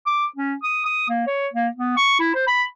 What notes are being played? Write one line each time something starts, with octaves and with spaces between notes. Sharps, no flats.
D6
C#4
D#6
D#6
A#3
C#5
A#3
B3
C#6
E4
C5
B5